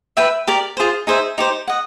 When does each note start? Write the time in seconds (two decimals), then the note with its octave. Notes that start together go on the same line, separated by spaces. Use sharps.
0.17 B4 E5 G5
0.47 G4 A#4 D5
0.77 F4 G#4 C5
1.07 D#4 G#4 C5 E5
1.38 D#4 G4 C5
1.67 D#5 F#5